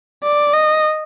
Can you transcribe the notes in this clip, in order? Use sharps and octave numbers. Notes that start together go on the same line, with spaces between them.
D5
D#5